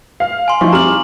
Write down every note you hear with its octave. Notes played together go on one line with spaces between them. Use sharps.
F5
G#5 C6
F3 D#4 E4 C#6
F2 G3 A#5 D6 F6 F#7